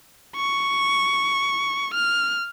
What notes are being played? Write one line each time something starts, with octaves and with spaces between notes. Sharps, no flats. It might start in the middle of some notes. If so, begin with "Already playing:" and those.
C#6
F6